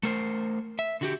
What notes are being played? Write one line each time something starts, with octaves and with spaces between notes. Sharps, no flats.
A3 A#4 C5
E5
D3 F#4 G4